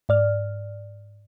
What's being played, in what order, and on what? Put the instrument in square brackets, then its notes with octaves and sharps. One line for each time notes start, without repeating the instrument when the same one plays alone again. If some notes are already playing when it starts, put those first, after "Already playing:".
[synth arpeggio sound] G#2 D5 F6